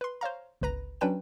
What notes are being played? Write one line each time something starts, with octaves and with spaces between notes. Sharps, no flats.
B4 C6
C5 C#5 F5 A#5
G1 C#2 B4 A#5 A#6
F#3 C#4 D4 B4 G5 E7